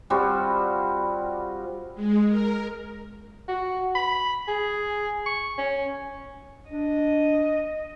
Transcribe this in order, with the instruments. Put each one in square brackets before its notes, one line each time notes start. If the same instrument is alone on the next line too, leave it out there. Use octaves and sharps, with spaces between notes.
[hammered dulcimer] G3 C4 F4 F#4
[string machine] G#3
A#4
[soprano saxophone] F#4
B5
G#4
C#6
C#4
[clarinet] D4 [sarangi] D#5